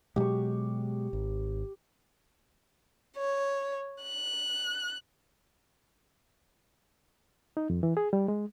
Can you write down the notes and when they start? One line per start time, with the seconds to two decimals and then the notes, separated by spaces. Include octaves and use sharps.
0.16 B2 F#3 G#3 G4 C#6
1.13 G#1
3.17 C#5
4.03 F#6
7.57 D#4
7.70 F2
7.83 E3
7.97 G#4
8.13 G3
8.28 G#3